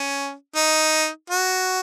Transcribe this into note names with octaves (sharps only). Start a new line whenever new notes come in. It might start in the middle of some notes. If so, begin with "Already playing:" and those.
Already playing: C#4
D#4
F#4